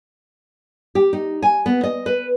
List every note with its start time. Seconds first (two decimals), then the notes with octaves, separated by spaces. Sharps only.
0.95 G4
1.13 D#4
1.42 G#5
1.66 B3
1.83 D#5
2.06 B4